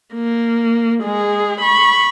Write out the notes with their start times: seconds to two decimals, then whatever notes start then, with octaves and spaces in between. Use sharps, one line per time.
0.13 A#3
1.03 G#3 G#4
1.61 B5 C#6